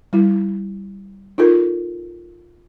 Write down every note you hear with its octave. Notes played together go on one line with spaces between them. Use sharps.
G3 E4
D#4 F4 A4 A#4